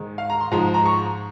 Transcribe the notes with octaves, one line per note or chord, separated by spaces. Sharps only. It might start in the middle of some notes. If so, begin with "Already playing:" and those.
Already playing: G#2 D#3 G#3
F5
A#5
C6
G#2 F3 G#3 A#5
A#5
C#6